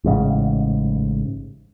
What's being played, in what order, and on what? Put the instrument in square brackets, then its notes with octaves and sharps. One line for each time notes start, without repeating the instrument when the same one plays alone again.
[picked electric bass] A1 G#2 C#3